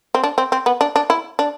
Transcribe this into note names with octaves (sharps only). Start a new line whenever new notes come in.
C4
D4
C4
C4
B3
D4
D4
E4
D4